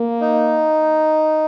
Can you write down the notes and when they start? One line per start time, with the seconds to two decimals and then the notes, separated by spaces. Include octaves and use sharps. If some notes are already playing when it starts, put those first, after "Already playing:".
Already playing: A#3
0.21 D#4